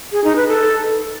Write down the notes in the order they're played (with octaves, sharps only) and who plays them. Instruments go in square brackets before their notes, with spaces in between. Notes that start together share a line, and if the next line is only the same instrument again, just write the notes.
[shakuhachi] G#4
D#4
B4
A4